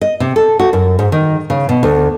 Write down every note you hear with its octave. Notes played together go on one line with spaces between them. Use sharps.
D#5
C3
A4
F#4
F#2
G#2
D#3
C#3
B2
D2